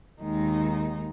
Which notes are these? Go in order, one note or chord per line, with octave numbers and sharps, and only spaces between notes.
D#2 D#3 G#3 D#4